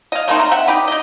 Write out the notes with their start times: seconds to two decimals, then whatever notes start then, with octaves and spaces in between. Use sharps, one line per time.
0.12 D#5 F5
0.28 A3 A#3 C4 D#4
0.40 A#5
0.51 C4 E5 F#5
0.68 D#4 G4 B4
0.88 D#4 D#5